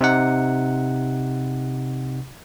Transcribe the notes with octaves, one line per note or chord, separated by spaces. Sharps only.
C3 D#4 F#5